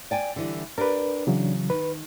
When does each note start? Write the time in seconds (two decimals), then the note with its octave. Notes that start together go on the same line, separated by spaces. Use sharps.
0.11 D5 G5 G#5
0.36 D3 E3 G3
0.78 D4 G4 A#4 B4 D5
1.27 C#3 E3 F#3
1.70 D#3 B4